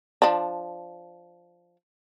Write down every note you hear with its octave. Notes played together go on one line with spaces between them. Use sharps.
F3 D4